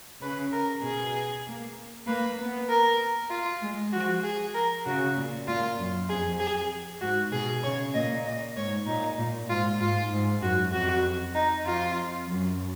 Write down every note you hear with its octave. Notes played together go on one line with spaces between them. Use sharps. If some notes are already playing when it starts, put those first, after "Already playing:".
C#3 B4
A#4
B2 G#4
A#3
A#3 B4
B3
A#4
F4
G#3
F3 F#4
G#4
A#4
C#3 F#4
A#2
A#2 F4
F#2
F2 G#4
G#4
G#2 F#4
B2 G#4
C#3 C#5
A#2 D#5
D#5
G#2 C#5
A#2 D#4
A#2
G#2 F4
G#2 F4
G#2
F#2 F#4
F2 F#4
D#4
F2 F4
F#2